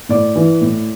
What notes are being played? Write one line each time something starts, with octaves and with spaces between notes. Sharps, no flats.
A2 D5
E3
A2